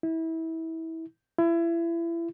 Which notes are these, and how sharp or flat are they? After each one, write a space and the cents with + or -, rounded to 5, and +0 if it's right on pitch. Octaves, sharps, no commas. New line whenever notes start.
E4 -25
E4 +30